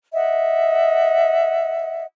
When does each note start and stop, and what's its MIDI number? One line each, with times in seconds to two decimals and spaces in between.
0.14 2.05 75
0.14 2.05 76
0.14 2.05 78